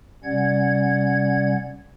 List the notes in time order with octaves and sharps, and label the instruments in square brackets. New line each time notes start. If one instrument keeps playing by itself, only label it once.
[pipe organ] C3 G3 C#4 D5 F#5 G#6